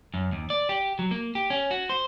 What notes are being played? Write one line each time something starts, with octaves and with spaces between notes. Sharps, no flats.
F#2
D#2
D5
G4
F#3
A#3
G4
C#4
F#4
C5